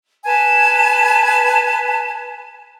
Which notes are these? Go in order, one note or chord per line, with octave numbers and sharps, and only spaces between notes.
B4 G#5 A5